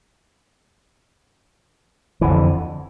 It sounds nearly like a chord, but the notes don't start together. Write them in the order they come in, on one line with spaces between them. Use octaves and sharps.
E3 D3 F2